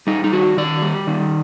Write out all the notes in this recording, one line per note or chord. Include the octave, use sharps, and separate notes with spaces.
G3 D#4
D#4
D#3 F#4
D#3 D5
G3
D#3